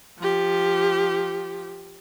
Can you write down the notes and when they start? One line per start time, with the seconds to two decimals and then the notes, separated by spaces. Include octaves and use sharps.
0.19 F3 G4